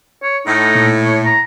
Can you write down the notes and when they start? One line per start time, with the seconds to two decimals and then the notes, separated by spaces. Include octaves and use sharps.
0.23 C#5
0.47 A2 D#4
0.75 A#2
1.05 C#5
1.25 A#5